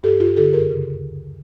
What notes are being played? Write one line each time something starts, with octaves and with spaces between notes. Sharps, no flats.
G2 G4 A4
G2 F4 G4
D3 G4 A4
F#2 G#4 A#4
C#3
D2
D3